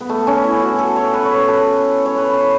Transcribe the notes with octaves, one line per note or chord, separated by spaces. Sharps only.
B3
A3
C#4
E4
F#4
A4
C#5
B4
C#5
B4
A4
C#5
B4
B4